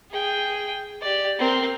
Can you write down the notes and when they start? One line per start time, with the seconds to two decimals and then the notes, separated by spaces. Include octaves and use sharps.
0.11 G#4 G5
1.02 G4 D5
1.39 C4 A#4